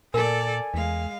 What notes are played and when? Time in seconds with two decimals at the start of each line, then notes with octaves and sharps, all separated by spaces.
0.14 A#2 A4 A#4 D5 G#5
0.74 E2 G#3 F5